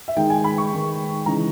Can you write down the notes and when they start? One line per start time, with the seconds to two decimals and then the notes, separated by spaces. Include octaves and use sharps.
0.08 E5
0.17 D#3 G#3 D#4 G5
0.30 G#5
0.44 B5
0.58 C#6
0.72 D#3 G#3 D#4
1.25 C#3 E3 G#3 D#4 A#5